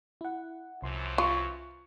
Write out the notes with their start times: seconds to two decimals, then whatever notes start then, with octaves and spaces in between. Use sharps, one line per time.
0.21 E4 F#5
0.83 C2 F#2 E3 F3 C6
1.18 F4 C#6